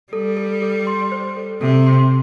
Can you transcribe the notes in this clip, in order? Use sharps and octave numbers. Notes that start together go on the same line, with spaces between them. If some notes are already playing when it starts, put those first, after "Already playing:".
G3 A4
A4
A4
C6
C5
A4
C3 A4
C6